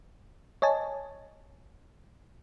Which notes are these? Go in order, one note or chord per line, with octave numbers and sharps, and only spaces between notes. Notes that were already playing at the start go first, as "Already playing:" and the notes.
C#5 D#5 G#5 A5